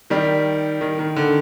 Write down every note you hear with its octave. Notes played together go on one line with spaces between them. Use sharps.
D#3 G3
D#3
D#3
D3